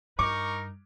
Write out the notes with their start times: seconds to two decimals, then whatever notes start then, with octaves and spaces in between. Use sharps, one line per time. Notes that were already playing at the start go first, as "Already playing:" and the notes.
0.19 G2 D#4 A#4 C#6 D6